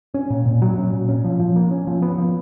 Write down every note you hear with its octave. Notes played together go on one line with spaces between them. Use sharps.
C#4
A#2
A#2
F#3
C#4
A#2
C#4
F3
F3
A#3
C#4
F3
B3
F3